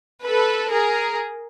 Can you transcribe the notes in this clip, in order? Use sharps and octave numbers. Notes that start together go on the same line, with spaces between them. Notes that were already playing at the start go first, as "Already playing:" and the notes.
A4 B4
G#4 A#4